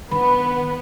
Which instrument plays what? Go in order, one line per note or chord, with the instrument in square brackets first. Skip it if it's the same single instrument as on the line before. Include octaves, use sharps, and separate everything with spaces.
[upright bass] D#3 D4 [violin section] B3 [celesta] B5